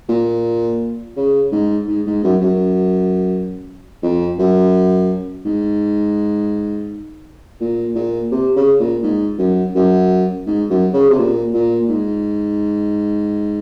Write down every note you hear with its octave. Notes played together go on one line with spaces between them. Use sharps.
A#2
C#3
G#2
G#2
G#2
F#2
F#2
F2
F#2
G#2
A#2
A#2
C3
C#3
A#2
G#2
F#2
F#2
G#2
F#2
C#3
C3
A#2
A#2
G#2